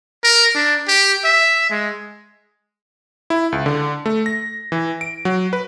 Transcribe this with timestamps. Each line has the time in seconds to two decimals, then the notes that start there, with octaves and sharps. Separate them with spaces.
0.24 A#4
0.55 D4
0.88 G4
1.24 E5
1.70 G#3
3.30 E4
3.52 C#2
3.66 D3
4.06 A3
4.26 A#6
4.72 E3
5.01 D7
5.25 F#3
5.53 B4